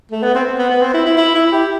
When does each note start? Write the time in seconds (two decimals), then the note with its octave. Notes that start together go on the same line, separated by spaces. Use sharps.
0.11 A3
0.23 B3
0.35 C4
0.59 B3
0.70 B3
0.82 C4
0.94 E4
1.06 E4
1.17 E4
1.35 E4
1.52 G4